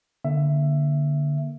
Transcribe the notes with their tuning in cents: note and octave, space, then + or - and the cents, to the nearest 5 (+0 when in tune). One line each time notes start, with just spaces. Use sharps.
D3 +0 A#3 +20 E5 +15